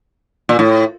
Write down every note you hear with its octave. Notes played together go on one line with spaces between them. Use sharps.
A#2
A2